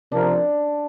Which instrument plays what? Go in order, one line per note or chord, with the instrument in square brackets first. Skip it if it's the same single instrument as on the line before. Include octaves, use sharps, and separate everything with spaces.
[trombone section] C3 F3 C4 A#4 [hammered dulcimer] D4